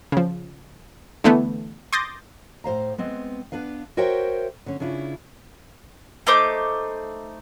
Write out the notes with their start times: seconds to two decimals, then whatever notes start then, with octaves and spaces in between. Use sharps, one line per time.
0.12 C#3 F3
1.24 D3 E3 A3 B3
1.93 C6 D6 D#6 G6 A6 A#6
2.64 A2 C5 F5 A#5
2.98 G#3 B3 C4
3.52 B3 D4 B4 F5
3.97 F#4 A#4 C5 C#5 E5 G5
4.66 D3 C#4
4.80 C#3 C#4 D4 E4 F4
6.27 A3 D#4 C5 D6